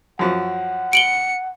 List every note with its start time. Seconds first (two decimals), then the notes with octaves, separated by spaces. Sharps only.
0.19 F#2 F3 F#4 F#5
0.93 C#7 D7 F#7 G7